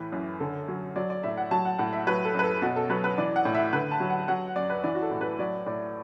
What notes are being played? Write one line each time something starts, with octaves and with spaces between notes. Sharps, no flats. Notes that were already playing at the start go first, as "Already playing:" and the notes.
Already playing: A2 E3 B4
F#2
D3 A4
F#3
F#3 D5
D5
A2 E5
F#5
F#3 A5
F#5
A2 F#5
E5
F#3 B4
A4
F#2 B4
A4
B2 F#4
A4
F#3 B4
B4
E3 D5
F#5
A2
E5
D3 B4
A5
F#3
F#5
F#3 F#5
F#2 D5
B4
E3 D5
F#4
A4
A2
B4
F#3 D5
A2 D5